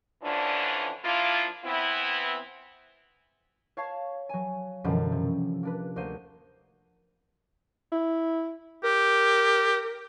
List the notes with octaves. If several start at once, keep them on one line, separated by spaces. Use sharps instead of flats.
D3 E3 F3 C#4 D4
F3 A#3 D4 E4 F4
E3 B3 C4 E4
C#5 F5 A5 C#6 G#6 C7
F#3 G#5
F#2 B2 D3 E3 F3 G3
C3
A#3 D4 B4
D2 A#3 C5 D#7
E4
G4 A#4